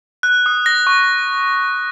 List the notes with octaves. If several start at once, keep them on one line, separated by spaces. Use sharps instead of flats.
F#6
D#6
A#6
C#6